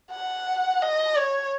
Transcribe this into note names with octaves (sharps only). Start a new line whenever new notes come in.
F#5
D#5
C#5